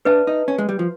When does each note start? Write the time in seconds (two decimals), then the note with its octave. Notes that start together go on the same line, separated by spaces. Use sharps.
0.05 D4 B4 E5 A5
0.27 D#4
0.48 C#4
0.58 G#3
0.69 G3
0.79 F3